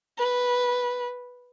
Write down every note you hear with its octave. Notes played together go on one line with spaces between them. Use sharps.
B4